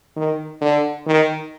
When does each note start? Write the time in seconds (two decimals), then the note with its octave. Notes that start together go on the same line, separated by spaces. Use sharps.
0.16 D#3
0.61 D3
1.07 D#3